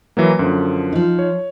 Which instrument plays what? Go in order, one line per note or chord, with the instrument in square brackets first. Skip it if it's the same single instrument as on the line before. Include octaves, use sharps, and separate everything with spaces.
[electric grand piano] E3 F#3 A#3
F#2 D3 F3
[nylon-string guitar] F3 D#4
[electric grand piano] C#5